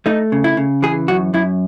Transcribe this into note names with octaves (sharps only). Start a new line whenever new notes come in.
A3 D#4
C#3
E4
C#3
E3 G#4
F#2 F#4
F#2 E4